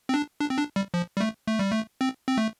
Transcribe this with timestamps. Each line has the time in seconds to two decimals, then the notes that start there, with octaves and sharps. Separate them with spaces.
0.09 C4
0.14 D4
0.40 D4
0.50 C4
0.58 D4
0.76 G3
0.94 F3
1.17 G3
1.21 A3
1.47 A3
1.59 G3
1.72 A3
2.01 C4
2.28 C4
2.38 A3